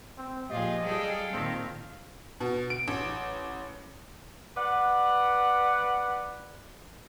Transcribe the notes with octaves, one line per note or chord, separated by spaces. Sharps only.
C4
A#2 F3 F4 G4 G#4 D#5
G3 G#4 A4 F5 G5
A#2 D#3 C4
B2
D7
A1
B4 D5 F#5